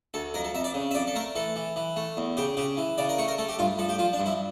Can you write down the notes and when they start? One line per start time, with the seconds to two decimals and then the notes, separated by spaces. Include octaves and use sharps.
0.14 D2 A4
0.34 F2 A#4
0.44 A4
0.55 F2 E5
0.64 D5
0.74 C#3
0.91 E5
0.94 F2 D5
1.07 A4
1.15 A3 A#4
1.35 E3 A4
1.56 E3
1.76 E3
1.96 A3
2.17 E2
2.37 C#3 G4
2.57 C#3 G4
2.77 E3
2.98 C#3 D5
3.09 A#4
3.18 A3 C#5
3.28 A#4
3.38 A3 A4
3.49 G4
3.59 G2 F4
3.79 F3 A4
3.89 G4
3.99 F3 F4
4.13 D4
4.20 G2
4.26 E4